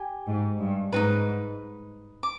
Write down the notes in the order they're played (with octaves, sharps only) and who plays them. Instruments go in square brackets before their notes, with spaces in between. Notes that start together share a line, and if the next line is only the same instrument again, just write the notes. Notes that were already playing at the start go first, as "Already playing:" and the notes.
Already playing: [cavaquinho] G4 G#5
[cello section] G#2
G2
[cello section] G#2 [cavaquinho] D#4 F#4 B4
[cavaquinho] D6